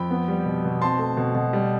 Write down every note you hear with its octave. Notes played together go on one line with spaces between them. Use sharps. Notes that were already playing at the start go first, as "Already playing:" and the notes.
Already playing: F2 G5 B5
B3
G3
B2
B2
C4 A5 C6
A3
B2
B2
G3